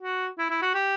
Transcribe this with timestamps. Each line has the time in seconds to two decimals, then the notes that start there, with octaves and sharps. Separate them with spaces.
0.02 F#4
0.38 E4
0.50 E4
0.62 F#4
0.74 G4